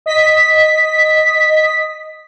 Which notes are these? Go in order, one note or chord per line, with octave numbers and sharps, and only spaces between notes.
D#5 B6